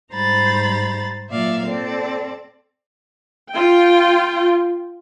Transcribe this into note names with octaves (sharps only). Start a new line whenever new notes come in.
G#2 G3 C5 A#5 B5 A6
A#2 F#3 D5 E5 F5
C4 A4 D5
F4 G5